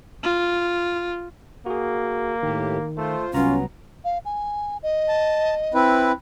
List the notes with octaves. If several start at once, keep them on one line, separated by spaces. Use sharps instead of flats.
F4
A#3 F#4 G#4
A2 D#3 G4
A3 F4 C5
C2 F#3 B3 C#4 F4 A#5
F5
G#5
D#5
A5
C4 E4 B4